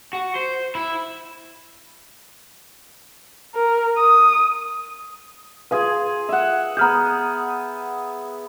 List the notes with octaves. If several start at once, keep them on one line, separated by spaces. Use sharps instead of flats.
F#4
C5
E4
A#4
D#6
F4 G#4 B4 F5 G#5
E5 F#5
B3 G#4 A#5 F6 G6